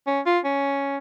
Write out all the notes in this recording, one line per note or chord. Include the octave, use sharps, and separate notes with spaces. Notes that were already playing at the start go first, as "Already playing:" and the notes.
C#4
F4
C#4